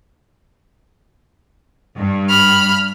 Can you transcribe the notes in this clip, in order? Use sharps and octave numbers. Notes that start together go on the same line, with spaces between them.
G2
B5 F6